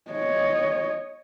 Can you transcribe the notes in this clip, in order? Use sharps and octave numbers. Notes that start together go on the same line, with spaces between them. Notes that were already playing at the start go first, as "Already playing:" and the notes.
C#5 D#5